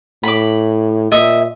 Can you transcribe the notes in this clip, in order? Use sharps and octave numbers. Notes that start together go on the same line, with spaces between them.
A2 B5 D6
A#2 D#5 E5